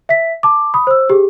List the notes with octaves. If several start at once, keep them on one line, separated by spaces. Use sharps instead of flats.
E5 B6
A5 D6
B5 D#6
C5 E6
G4 G#4